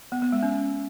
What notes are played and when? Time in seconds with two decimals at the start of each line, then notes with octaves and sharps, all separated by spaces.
0.12 B3
0.22 B3
0.32 G#3
0.43 C#4